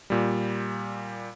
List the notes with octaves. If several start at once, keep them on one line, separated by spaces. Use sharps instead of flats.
A#2 G3